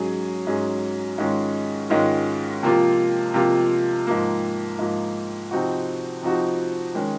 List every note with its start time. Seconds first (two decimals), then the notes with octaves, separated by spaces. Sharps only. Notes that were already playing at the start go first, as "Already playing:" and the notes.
Already playing: G#2 F#3 C#4 G#4
0.47 G#2 F#3 C#4 G#4
1.18 G#2 D#3 G#3 C#4 F4
1.90 G#2 D#3 G#3 C#4 F4
2.63 C3 F3 A#3 F4
3.34 C3 F3 A#3 F4
4.07 G#2 F3 A#3
4.79 G#2 F3 A#3
5.51 C3 F3 C4 D#4 F#4
6.23 C3 F3 C4 D#4 F#4
6.95 D#3 G#3 C#4